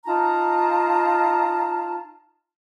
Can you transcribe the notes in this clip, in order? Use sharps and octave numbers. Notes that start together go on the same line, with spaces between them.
D#4 F4 A5 A#5